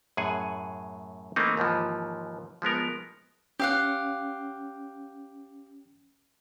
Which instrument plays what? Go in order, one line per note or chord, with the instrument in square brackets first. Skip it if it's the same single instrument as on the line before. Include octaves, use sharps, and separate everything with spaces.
[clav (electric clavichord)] F#2 A2 G#4 F#5 G#5
E3 A3 A#3 C4 D#4
D#2 G#2 E3 F3
F3 G#3 B3 A#4
[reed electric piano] C#4 [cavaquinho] G4 F5 F#5